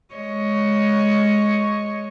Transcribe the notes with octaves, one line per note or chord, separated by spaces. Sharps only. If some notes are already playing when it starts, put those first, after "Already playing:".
G#3 C#5 D#5